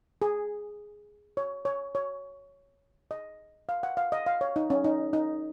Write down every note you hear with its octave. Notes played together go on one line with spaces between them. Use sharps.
G#4
C#5
C#5
C#5
D#5
F5
F#5
F5
D#5
F5
C#5
D#4
C#4
D#4
D#4